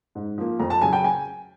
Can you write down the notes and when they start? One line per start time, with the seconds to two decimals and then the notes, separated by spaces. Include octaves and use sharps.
0.15 G#2
0.38 F3 A#3
0.59 F2 A#5
0.70 A5
0.81 C#3 F#3 G#5
0.93 G5
1.04 G#5